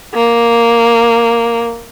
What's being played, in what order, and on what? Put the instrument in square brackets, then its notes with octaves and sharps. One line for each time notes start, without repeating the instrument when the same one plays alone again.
[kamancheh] A#3